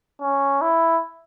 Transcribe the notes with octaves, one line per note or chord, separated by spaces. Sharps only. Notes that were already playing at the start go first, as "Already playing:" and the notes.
C#4
E4